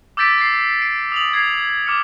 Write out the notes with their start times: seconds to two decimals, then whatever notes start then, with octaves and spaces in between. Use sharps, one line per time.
0.17 D6 E6 G6 A6 B6 D7
0.38 A6 C7
0.80 C7 D7
1.12 D#6 F7 F#7
1.33 G#6 C7
1.87 D6 F6 C#7